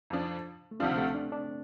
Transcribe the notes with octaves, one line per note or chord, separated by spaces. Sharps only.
F2 F3 D4
A3
D2 C3 F3 C4 D4 F4
A3
D4
D4